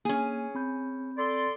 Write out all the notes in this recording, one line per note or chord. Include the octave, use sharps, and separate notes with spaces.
A#3 C#4 G#4
C4 B5 G6
A4 D5 C6